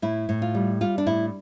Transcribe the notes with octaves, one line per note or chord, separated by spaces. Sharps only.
A2 E4
A2
F4
G3
G3 F4
D4
A2 E4